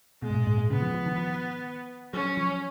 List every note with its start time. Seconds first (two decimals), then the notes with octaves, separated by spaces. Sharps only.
0.22 B2 G#3
0.30 G#2
0.34 A#2
0.47 G#2
0.58 A#2
0.70 C#3 B3
0.82 F3
0.94 F3
1.06 D#3
1.18 F3
2.13 F#3 C#4
2.37 F3